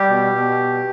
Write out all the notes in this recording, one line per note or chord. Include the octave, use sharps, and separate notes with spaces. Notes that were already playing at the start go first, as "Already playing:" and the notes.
Already playing: G3 G4
B2
B2